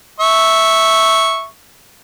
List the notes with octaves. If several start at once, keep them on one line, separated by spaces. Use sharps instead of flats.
E5 C#6